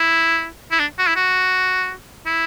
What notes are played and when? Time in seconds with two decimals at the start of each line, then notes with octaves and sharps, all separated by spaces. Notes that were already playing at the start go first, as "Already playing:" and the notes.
Already playing: E4
0.71 E4
0.79 D4
0.98 F#4
1.07 E4
1.16 F#4
2.26 E4